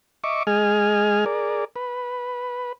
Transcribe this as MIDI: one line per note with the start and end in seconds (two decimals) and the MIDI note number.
0.24 0.43 75
0.24 0.43 76
0.24 0.43 85
0.24 0.43 86
0.47 1.25 56
0.47 1.25 68
0.47 1.25 75
0.47 1.25 80
0.47 1.25 89
1.26 1.65 68
1.26 1.65 70
1.26 1.65 74
1.76 2.72 71